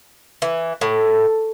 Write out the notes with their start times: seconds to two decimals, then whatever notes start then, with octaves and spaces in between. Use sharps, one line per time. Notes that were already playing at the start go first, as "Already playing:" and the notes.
0.42 E3
0.81 A2